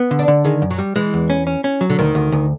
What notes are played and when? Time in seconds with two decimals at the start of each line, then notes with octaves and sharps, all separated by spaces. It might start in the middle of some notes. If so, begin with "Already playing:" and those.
Already playing: B3
0.11 D3
0.19 D4
0.28 D3
0.45 D#3 G#3
0.62 F#2
0.71 F#3
0.78 G3
0.96 E3 G#3
1.14 E2
1.30 C#4
1.47 C#4
1.64 C#4
1.81 F#3
1.90 D3
1.99 D2 D#3
2.15 D2
2.32 D2